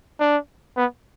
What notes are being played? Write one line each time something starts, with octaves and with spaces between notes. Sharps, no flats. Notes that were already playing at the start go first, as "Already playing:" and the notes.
D4
B3